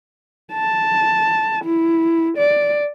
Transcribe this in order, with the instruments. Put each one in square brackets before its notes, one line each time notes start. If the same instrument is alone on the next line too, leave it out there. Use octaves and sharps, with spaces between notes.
[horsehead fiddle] A5
E4
D5